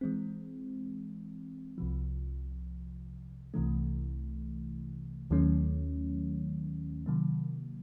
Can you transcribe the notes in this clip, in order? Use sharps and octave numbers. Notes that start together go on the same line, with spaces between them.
E3 G#3 C4
C2 C3 F3
C2 C3 E3 A3
D#2 D#3 F#3 A3 C#4
C3 D#3 F#3 A#3